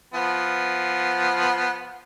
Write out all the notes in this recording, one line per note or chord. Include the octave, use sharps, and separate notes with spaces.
F3 B3